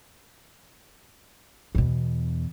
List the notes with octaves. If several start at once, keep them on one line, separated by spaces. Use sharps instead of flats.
E2 B2